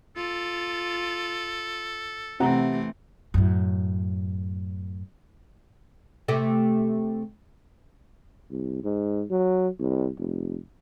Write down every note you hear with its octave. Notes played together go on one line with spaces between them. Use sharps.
F4 A4
C3 E3 A3 C4 F#5 A#5
F#2 A2
C3 A3 G4
C2
G#2
F#3
C2
F1